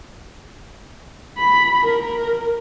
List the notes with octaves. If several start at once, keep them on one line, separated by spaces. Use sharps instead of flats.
B5
A#4